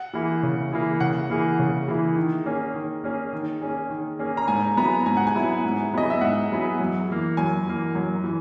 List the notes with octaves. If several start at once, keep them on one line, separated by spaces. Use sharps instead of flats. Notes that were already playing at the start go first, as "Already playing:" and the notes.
Already playing: F#5
E3 A#3 E4 G#4
C#3
E3 A#3 E4 G#4
C#3 F#5
E3 A#3 E4 G#4
C#3
E3 A#3 E4 G#4
D#3
A#3 C#4 G#4
D#3
A#3 C#4 G#4
D#3
A#3 C#4 G#4
D#3
A#3 C#4 G#4
A#5
G#2 G#5
F#3 B3 E4 G#4 A#5
G#2 G#5
F#5
G#5
F#3 B3 E4 G#4
G#2
F#3 B3 E4 G#4 D#5
E5
G#2 F#5
F#3 B3 E4 G#4
F#2
E3 A#3
F#2 G#5
E3 A#3
F#2
E3